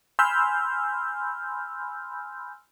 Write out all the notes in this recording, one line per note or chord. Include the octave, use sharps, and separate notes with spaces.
G#5 B5 C6 E6 F6 G6